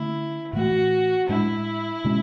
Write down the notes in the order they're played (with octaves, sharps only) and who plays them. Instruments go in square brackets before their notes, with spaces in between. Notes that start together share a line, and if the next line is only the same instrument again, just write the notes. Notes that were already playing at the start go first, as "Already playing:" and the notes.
Already playing: [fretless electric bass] D3 A3 C#4 [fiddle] E4
[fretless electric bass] A2 E3 A3 [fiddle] F#4
[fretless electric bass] A2 G#3 D4 [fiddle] E4
[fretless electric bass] B2 G#3 C#4